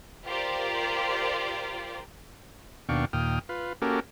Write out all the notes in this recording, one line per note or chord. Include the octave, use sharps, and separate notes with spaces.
F4 G4 A#4 C5 D5
D#2 B2 D4 F5 G5 C#6
D#2 A#2 G5 D#6 F6
F4 B4
A#3 C#4 F#4 G4 A4 A#4